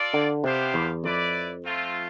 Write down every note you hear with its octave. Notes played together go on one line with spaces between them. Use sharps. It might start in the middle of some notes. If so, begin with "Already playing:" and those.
Already playing: F4 A4 D5
D3
C3 B3 D4 G4 C5 F5
E2
F2 E4 B4 D5
A3 C4 F4